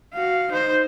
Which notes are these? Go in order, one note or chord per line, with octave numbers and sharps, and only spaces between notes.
F#4 F5
D#4 C5